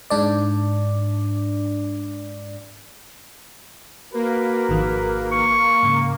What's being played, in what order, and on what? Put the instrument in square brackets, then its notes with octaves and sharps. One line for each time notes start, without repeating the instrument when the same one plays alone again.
[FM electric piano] G#2 D4 D5
[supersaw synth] A#3 [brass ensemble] F#4 A#4 B4
[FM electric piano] G#1 D#3 F3
[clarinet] C#6
[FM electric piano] G#2 C#3